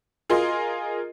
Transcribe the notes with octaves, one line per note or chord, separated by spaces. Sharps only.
F4 G#4 A#4 D#5 C6